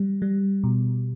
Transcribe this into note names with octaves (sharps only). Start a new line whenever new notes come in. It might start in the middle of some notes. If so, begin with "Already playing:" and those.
Already playing: G3
G3
B2